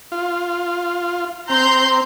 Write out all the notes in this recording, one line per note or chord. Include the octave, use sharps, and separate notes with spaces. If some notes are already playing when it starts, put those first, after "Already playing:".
F4
C4 A#5 C6 G6